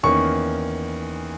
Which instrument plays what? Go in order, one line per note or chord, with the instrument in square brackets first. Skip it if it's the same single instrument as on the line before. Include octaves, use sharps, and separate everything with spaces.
[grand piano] E2 D#3 A#3 C#4 C#6